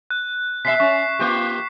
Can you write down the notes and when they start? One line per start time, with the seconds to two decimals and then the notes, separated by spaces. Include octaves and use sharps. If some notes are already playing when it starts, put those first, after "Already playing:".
0.10 F#6
0.65 B2 E5 B6 C7
0.80 C#4 C#6
1.19 A#3 F4 G4